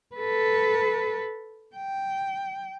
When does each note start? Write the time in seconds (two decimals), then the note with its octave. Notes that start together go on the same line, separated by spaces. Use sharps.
0.15 A4 B4
1.76 G5